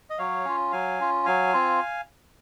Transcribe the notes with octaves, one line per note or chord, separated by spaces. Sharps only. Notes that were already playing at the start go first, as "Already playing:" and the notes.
D#5
F#3 C#5 F5
C#4 F4
F#3 F5 G#5
C#4 F4
F#3 F5 G#5
C4 F4